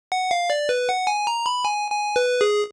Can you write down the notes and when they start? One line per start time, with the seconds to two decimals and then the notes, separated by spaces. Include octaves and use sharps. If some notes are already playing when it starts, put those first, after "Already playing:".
0.12 F#5
0.31 F5
0.50 D5
0.69 B4
0.89 F#5
1.07 G#5
1.27 A#5
1.46 B5
1.65 G#5
1.91 G#5
2.16 B4
2.41 G#4